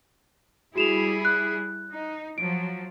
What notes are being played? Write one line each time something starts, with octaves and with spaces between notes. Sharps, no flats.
G3 E4 F#4 G#4 E7 F7
F#6
D#4
F3 F#3 D7